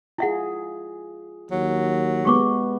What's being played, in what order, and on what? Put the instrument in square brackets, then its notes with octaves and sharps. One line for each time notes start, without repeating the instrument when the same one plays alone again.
[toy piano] E4 E5 F#5 [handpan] F4 G#4
[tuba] D#2 [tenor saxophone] F#3
[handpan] G#3 B3 [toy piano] G4 C#6 D6